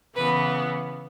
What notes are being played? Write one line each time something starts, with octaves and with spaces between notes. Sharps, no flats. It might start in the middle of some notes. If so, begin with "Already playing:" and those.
C#3 E3 B3 B4